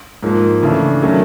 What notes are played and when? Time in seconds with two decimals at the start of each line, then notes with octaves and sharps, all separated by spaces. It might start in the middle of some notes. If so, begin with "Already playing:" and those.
0.23 G#2 F3 A#3
0.63 C#3 E3 A3 D4
1.02 D#3 F#3 A3 C#4